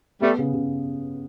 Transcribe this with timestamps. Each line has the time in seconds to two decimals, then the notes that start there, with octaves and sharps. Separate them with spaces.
0.21 G3 A3 B3
0.38 C#3
0.54 C#3